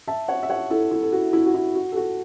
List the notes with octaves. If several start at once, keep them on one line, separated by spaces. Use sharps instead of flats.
E5 A5
C#5 F#5
E5
C#5 F#5
E4 A4
E4 A4
A4
F#4
E4
F#4
E4
F#4
A4
F#4